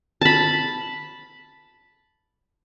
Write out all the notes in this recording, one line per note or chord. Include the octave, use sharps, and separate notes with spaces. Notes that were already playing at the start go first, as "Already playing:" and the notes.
A5 B5